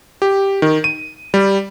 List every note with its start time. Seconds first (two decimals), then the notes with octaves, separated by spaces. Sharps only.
0.22 G4
0.62 D#3
0.84 D#7
1.34 G3